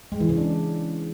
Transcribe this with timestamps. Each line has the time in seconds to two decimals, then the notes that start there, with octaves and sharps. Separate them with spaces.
0.12 G#3
0.20 E3
0.29 C#3
0.38 D4